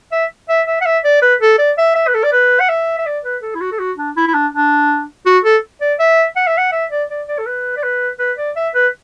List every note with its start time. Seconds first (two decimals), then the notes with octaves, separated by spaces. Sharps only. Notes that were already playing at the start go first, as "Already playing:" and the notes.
0.12 E5
0.49 E5
0.67 E5
0.81 F#5
0.86 E5
1.04 D5
1.22 B4
1.41 A4
1.58 D5
1.78 E5
1.95 E5
2.07 B4
2.14 A4
2.24 D5
2.32 B4
2.60 F#5
2.69 E5
2.98 E5
3.06 D5
3.24 B4
3.42 A4
3.55 E4
3.61 F#4
3.72 A4
3.79 F#4
3.98 D4
4.16 E4
4.27 E4
4.34 D4
4.53 D4
5.26 F#4
5.44 A4
5.81 D5
5.99 E5
6.36 F#5
6.47 E5
6.58 F#5
6.72 E5
6.91 D5
7.09 D5
7.28 D5
7.38 A4
7.46 B4
7.77 D5
7.83 B4
8.19 B4
8.38 D5
8.56 E5
8.74 B4